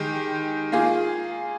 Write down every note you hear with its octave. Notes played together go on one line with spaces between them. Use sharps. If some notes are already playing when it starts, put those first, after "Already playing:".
Already playing: D#3 G#3 D#4 G4
A#3 F4 G#4